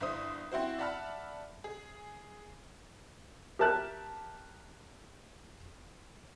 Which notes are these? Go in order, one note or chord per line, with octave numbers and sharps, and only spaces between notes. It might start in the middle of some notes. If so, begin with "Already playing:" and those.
G1 E4 C5 D#6
C4 E4 F#4 C5
D5 E5 F#5 A5 B5 F6
G#4
G4 A#4 E5 A5 F6 F#6